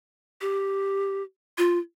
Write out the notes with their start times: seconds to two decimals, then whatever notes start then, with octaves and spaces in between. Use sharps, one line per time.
0.41 G4
1.58 F4